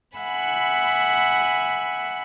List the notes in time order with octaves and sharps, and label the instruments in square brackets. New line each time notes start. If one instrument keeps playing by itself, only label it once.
[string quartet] E5 F#5 G#5 B5